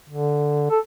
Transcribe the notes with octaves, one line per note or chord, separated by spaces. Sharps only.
D3
A4